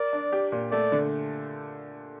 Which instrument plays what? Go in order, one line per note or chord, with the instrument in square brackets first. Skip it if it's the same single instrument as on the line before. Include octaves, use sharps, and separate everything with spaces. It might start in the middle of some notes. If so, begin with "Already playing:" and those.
Already playing: [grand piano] A#4 [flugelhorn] D5
[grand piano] D4
G4
A#2
[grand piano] A3 [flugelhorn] D5
[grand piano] D3